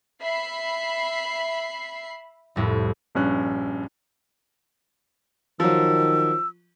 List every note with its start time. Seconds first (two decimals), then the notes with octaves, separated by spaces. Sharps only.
0.23 E5 B5 C7
2.56 C2 F2 A2
3.15 A#1 G2 C#4 F#6
5.60 D#3 F3 F#3 E6